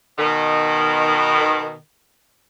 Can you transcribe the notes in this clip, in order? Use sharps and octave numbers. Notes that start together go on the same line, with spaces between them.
B2 D#3